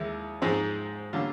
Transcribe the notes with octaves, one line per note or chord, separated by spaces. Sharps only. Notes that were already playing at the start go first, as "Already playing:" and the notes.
Already playing: D#2 D#3 G#3 E4
G#2 F3 G#3 C4
D3 G3 A#3 C#4 F4